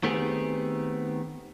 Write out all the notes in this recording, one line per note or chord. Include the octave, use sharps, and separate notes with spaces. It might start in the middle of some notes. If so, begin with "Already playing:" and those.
D#3 A3 B3 C4 G4 G#4